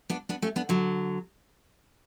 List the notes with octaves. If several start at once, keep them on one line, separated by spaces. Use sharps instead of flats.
B3 D4
B3 D4
A3 C#4
B3 D4
D3 F#3